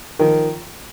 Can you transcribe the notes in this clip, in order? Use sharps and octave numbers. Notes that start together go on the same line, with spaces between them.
D#3 F3